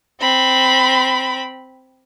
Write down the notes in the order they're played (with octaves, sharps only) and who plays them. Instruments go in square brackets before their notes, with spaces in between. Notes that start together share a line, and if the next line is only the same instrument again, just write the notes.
[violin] C4 B5